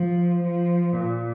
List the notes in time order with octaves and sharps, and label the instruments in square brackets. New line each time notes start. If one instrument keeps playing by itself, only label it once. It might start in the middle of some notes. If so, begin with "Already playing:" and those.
Already playing: [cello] F3
F3
A#2